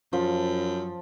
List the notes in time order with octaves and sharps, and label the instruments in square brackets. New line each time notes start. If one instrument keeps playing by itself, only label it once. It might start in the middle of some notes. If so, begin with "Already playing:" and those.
[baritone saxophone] F#2 [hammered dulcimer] F3